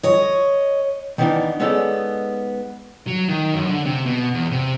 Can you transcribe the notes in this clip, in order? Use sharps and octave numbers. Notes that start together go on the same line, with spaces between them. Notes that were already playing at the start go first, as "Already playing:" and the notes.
C#5 D#5
D#3 E3 B3 C4 D4 D#4
G#3 B3 C#4 D#4 A4 D5
F#3
D#3
F#2
D3
C3
B2
E2
C3